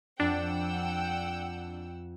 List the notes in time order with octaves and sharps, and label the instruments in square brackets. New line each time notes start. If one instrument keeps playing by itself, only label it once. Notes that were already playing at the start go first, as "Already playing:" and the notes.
[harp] F2 [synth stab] D4 [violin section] F#5 G5 E6